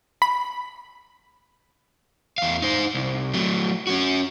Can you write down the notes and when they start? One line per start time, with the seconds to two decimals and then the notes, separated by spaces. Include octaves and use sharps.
0.22 B5
2.38 E2 F5
2.62 D#4 C5
2.94 C2
3.34 F#3 A3
3.87 C#4 F#4